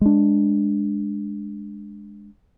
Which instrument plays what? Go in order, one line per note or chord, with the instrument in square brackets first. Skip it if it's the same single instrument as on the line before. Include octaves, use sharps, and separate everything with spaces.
[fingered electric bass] G#3 D4